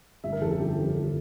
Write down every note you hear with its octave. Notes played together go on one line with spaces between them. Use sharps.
G1 E5
A#4
F2 E3 A4
A4
G1 G4
F2 E3
G1